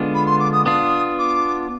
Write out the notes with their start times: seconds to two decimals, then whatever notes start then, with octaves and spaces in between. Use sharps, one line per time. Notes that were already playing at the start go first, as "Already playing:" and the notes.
Already playing: D3 G#3 B3 D4 F4
0.14 B5
0.26 C6
0.40 D6
0.52 D#6
0.66 B3 D4 F4 D#6
1.18 D6